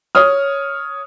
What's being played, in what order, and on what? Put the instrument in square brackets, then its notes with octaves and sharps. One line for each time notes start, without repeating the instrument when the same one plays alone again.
[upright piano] C#5 D#6 F6